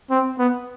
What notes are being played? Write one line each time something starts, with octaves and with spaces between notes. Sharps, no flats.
C4
B3